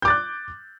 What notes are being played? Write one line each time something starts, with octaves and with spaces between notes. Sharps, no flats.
D6 F#6 G6 A6